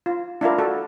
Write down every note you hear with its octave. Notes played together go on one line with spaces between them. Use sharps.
F4
D4 E4 F4 A#4
F#4 A4